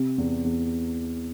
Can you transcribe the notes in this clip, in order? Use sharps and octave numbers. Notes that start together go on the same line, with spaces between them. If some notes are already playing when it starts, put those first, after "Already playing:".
Already playing: C3
E2
E2